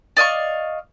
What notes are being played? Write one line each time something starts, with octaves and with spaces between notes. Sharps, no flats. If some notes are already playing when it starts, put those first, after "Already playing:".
D5 D#5 F5 C#6